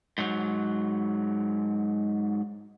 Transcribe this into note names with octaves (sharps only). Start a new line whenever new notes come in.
G#2 F#3